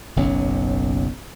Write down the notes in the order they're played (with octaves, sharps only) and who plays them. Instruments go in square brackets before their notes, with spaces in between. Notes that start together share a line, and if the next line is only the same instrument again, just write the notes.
[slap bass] F#1 B1 F#3 C#4